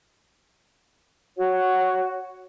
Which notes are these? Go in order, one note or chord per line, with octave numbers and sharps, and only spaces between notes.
F#4 C#5 F#5